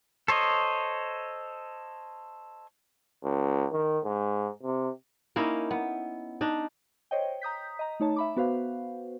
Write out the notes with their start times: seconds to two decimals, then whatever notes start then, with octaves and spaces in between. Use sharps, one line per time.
0.28 A4 C5 C#5 D#5
3.24 C#2
3.72 D#3
4.05 G#2
4.63 C3
5.36 A#3 C#4 D#4 E4
5.71 B3
6.41 D4 D#4
7.11 C5 C#5 D#5 G5
7.42 A#5 D#6 G6 B6
7.79 D#5 A#5
8.00 A3 D#4 C#5 A5
8.16 E5 B5 D6
8.37 B3 F#4 B4 C5 F5